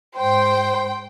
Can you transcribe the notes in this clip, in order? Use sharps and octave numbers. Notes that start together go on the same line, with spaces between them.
G#2 C5 G5